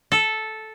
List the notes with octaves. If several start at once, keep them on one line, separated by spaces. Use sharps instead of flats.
A4